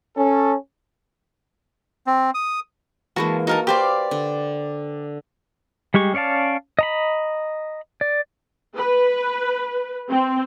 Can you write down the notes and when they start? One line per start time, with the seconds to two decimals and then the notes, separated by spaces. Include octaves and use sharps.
0.17 C#4 A4
2.07 C4
2.35 D#6
3.16 E3 G#3 A#3 F#4 A5 B5
3.47 D#4 F#4 A#4 A5
3.67 G4 B4 C5 D5 F5
4.11 D3
5.94 G3 G#3 G4 C#6
6.14 C#4 C#5 D5 F5 A5
6.79 D#5 A#5 B5
8.01 D5
8.76 B4
10.09 C4